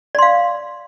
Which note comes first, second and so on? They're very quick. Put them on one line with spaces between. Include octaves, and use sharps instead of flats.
D5 C6 F5